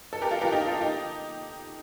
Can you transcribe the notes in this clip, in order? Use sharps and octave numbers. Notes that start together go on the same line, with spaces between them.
A4
G4 A#4
F4 A4
G4 A#4
D#4 G4
F4 A4
D#4 G4